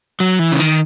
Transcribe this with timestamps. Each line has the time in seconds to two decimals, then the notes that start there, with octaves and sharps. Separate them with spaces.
0.20 F#3
0.39 E3
0.52 C#3
0.60 D#3